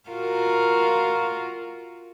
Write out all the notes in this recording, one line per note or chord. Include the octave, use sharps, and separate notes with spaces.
F4 F#4 A#4